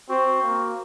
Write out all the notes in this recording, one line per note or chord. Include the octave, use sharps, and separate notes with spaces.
C4 F#4
A#3